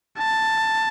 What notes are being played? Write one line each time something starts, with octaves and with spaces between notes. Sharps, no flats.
A5